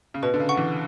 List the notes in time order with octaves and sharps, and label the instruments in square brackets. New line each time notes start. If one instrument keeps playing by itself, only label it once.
[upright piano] C#3
[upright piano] B2 [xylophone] B4
[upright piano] D3
C#3
[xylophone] F#5 C#6
[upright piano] E3